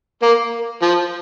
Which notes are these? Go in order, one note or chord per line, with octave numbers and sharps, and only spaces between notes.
A#3
F3